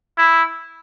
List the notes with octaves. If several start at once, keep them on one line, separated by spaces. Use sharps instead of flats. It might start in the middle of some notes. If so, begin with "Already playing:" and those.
E4